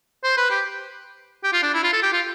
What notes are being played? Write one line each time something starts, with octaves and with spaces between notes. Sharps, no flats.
C5
B4
G4
G4
F4
D4
E4
F4
A4
G4
F4